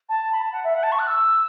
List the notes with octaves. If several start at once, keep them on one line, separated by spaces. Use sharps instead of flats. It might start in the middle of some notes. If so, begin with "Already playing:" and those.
A5
B5
A5
F#5
E5
F#5
A5
C#6
F#6
E6